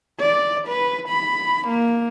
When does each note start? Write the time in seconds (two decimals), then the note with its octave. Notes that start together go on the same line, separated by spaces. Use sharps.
0.20 D5
0.68 B4
1.09 B5
1.68 A#3